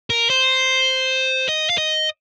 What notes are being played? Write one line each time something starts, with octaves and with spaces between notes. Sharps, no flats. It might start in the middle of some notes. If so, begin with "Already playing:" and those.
A#4
C5
D#5
F5
D#5